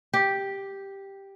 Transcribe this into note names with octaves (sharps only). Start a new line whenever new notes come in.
G4